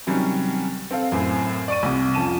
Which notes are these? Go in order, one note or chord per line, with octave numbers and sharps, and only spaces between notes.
C3 D#3 F#3 G3 C#4
C4 A4 F5
F#2 A2 C4
D5 C#6 D#7
C2 C3
F2 F3 C#4 A5 D#7 E7